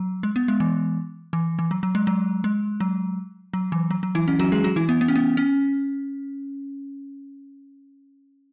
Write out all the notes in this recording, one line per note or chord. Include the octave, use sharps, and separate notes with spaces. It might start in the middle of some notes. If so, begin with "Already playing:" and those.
Already playing: F#3
G#3
B3
G#3
E3
E3
E3
F#3
F#3
G#3
F#3
G#3
F#3
F#3
E3
F#3
F#3
E3 E4
C#4
F#3 F#4
G#3 G#4
F#3 F#4
E3 E4
B3
B3
C#4
B3
C#4